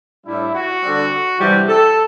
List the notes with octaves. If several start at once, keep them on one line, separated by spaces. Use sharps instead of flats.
A2 G3 D4 E4
F#4
D3 G3 C4
C3 E3 G3 D4 G4
A4